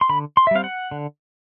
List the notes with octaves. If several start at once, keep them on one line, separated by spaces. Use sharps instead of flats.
C6
D3 B5
C6
E5
G3 C4 F5
F#5
D3